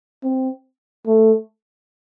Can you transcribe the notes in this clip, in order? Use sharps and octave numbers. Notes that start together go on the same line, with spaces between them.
C4
A3